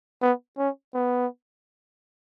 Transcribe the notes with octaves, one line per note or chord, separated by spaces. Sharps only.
B3
C#4
B3